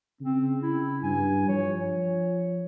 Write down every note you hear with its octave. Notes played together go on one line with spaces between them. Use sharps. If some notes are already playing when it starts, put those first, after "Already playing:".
C#3 C4
E4
G2 G#5
F3 C#5
C#5